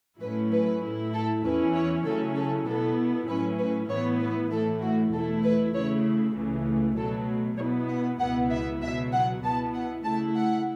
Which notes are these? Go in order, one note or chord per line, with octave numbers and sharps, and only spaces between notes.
A2 F#3 A3 C#4 E4 B4
B4
A2 A3 E4
A4
E2 E3 C#4 E4 B4
C#5
C#3 F#3 A3 C#4 E4 A4
A4
B2 B3 E4 A4
A2 F#3 C#4 E4 B4
B4
A2 E3 B3 E4 C#5
B4
A2 E3 A3 E4 A4
F#4
E2 B2 A3 E4 A4
B4
C#3 A3 E4 C#5
C#2 C#3 E3 A3
B2 F#3 A3 A4
B2 B3 E4 C#5
F#5
C#2 B2 B3 E4 F#5
E5
C#2 B2 F#3 E5
F#5
B2 B3 E4 A5
F#5
C#3 A3 E4 A5
F#5